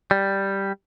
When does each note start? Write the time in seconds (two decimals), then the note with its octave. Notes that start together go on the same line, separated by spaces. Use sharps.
0.11 G3